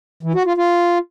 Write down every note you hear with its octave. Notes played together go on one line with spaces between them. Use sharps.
E3
F#4
F4
F4